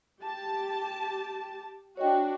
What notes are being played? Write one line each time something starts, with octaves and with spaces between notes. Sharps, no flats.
G4 A5
D4 F#4 C#5 D#5 G5